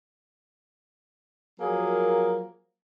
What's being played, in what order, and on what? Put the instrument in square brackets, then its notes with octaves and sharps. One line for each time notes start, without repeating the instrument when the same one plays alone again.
[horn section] F3 F#3 A#3 G#4 A#4